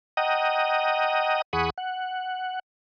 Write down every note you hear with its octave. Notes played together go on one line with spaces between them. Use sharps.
D#5 F#5 G5 A#5 D#6
E2 G#4 F#5 B5 C#6 D#6
F#5